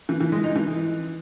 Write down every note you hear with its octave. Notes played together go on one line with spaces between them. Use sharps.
E3
E3
G#3
D#4
E3